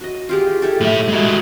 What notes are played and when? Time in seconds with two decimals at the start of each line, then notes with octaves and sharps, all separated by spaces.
0.01 F#4 D#5
0.29 F4 G4 G#4
0.62 E4 G4 A4
0.80 A2 E5
1.08 G#3 F#4